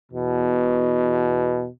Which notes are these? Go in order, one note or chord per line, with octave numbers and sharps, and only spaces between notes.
E2 B2